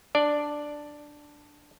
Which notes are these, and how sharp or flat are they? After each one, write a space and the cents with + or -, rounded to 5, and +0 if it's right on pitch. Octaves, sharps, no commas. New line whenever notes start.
D4 +0 D5 +5